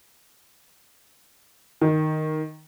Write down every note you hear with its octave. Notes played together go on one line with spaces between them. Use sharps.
D#3